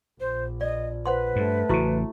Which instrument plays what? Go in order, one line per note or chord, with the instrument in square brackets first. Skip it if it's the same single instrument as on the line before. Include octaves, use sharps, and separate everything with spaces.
[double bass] A#1 [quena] C5
[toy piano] D5 [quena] D#5
[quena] B4 [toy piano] C5 F#5 C6
[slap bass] G2 [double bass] A3
[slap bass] A1 C#3 [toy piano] E4 F#4 C#6